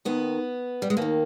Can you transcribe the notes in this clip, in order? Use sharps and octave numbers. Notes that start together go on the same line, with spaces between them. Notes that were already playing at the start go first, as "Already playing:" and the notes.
D#2 D#3 B3
G3
G#3
D#2 D#3 A#3